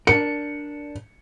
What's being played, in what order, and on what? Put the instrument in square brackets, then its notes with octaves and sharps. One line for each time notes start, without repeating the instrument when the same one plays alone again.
[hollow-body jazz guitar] D4 A#4 [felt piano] C#7